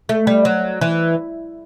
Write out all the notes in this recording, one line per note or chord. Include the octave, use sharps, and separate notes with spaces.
A3
G3
F#3
E3